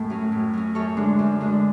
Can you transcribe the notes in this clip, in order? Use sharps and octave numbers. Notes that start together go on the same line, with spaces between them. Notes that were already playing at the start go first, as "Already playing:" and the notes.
Already playing: F#2 A2 A3 A4
F#3 C#4
A2
F#3 C#4
F#2 A4 C#5
D3 G#3 D4
F#2
D3 G#3 D4